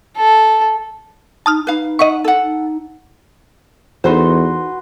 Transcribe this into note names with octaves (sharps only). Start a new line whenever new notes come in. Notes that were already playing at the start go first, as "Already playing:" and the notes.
A4
D#4 A5 D#6 F6
D#4 B4 F5
D#5 E5 F#5 C#6
A4 F#5
D#4
E2 D#4 F#4 A4 B4 C5 C6